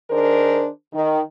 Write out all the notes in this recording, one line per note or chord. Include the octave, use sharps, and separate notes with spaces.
D#3 D4 G#4 A#4 C5
D#3